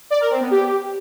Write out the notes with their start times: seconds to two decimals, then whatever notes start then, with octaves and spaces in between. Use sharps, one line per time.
0.10 D5
0.21 A#4
0.31 C4
0.41 B3
0.51 G4